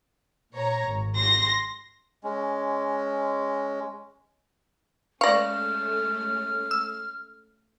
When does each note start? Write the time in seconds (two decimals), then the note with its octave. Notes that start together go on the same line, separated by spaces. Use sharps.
0.52 A#2 C#5 A#5
0.84 G#1
1.16 C6 A#6
2.24 G#3 C#4
5.21 G#3 A3 C#4 D5 F5 C#6 F6 A#6
6.71 E6